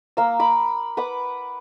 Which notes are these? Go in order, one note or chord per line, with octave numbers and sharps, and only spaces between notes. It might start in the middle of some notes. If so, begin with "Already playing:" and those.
A#3 E6
B5 D6
B4 F#5 D6